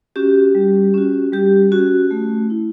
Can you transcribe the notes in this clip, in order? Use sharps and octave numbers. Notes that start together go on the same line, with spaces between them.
C#4 F#4 G4
G3
C#4 F#4
G3 G4
C#4 F#4
A3
E4